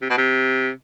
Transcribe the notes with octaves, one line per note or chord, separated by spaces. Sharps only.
C3
B2
C3